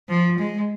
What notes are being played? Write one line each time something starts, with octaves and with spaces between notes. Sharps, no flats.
F3
G#3